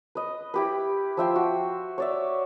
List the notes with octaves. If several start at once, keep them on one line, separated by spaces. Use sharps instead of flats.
B4 D#5
E4 G4 B4
F3 E5 G5 C6
F#4
C#5 D5 E5